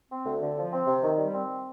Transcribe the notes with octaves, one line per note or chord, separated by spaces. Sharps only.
C4
D2
D3
F3
C4
C3
D#3
G3
C4